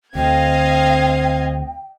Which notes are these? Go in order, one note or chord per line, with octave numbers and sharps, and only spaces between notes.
D2 D3 C4 D#5 F5 G5 G#6